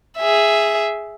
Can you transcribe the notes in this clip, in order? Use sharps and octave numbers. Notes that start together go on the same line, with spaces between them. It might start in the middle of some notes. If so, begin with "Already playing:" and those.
G#4 E5